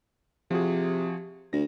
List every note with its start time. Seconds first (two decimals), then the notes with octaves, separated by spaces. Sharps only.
0.51 C3 F3 F#4 G#4
1.53 D2 A#6